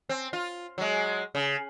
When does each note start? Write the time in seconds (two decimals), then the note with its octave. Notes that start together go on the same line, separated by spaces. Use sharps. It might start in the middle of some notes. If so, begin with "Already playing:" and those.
0.09 C4
0.33 F4
0.78 F#3 G#3
1.35 C#3